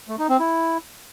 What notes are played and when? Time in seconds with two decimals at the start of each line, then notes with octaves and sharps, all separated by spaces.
0.08 A3
0.19 D#4
0.29 C4
0.39 E4